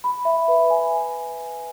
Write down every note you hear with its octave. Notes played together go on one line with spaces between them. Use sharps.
B5
E5
B4
G#5